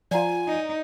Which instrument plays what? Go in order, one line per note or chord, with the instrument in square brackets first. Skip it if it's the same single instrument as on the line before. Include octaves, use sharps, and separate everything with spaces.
[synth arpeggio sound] F3 F4 [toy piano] D5 F#5 A#5 [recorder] G#5
[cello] D#4